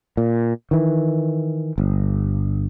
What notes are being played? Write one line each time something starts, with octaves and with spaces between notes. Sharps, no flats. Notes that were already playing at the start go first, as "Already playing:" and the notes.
A#2
D#3 E3
G1